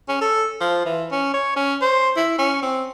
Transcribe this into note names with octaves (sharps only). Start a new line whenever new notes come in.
C#4
A4
F3
E3
C#4
C#5
C#4
C5
E4
C#4
C4